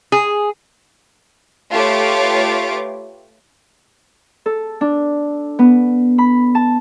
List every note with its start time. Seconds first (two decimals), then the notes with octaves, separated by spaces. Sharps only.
0.12 G#4
1.71 A3 F4 G4 B4 C#5 D6
4.46 A4
4.81 D4
5.59 B3
6.18 B5
6.55 A5